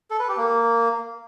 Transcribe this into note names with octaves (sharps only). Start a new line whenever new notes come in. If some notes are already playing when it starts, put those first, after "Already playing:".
A4
B4
G4
A#3